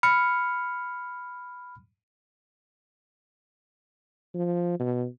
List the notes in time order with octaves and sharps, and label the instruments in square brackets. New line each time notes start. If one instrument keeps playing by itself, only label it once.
[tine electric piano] B5 F6 C#7
[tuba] F3
B2